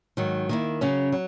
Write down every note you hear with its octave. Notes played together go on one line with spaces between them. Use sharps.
G#2 D#3 F#3
D#3 A#3 E4
C#3 F#3 C#4
F#3